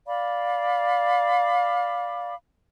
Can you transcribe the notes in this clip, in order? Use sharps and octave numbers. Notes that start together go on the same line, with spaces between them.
D5 F5 B5 D6